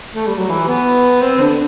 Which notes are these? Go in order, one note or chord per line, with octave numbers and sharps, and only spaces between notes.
A3
G3
F#3
E3
B3
C4
D3